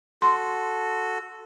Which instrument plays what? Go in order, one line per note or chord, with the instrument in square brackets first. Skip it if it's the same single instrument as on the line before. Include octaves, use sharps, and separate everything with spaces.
[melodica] F#4 A4 [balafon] C6